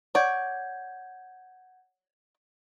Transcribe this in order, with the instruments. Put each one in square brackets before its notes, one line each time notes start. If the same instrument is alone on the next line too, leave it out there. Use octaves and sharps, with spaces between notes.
[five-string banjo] C#5 D5 [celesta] F#5 G6 G#6